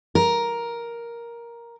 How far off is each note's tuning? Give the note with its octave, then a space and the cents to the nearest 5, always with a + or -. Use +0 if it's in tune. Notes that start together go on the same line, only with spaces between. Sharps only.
A#4 +10